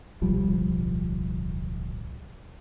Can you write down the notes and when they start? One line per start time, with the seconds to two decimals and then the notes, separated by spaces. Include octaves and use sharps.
0.21 D1 B1 F3 G3